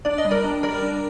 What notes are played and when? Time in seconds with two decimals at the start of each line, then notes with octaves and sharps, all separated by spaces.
0.05 D4 D5
0.18 D#5
0.25 G3
0.31 A#4 D5
0.44 D4
0.63 G3 A#4 D5
0.83 D4